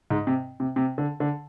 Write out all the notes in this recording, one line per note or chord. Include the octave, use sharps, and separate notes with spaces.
G#2
C3
C3
C3
D3
D3